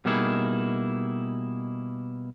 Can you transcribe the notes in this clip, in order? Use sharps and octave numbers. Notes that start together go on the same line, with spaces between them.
B2 G3 A#3 D#4 E4 G#4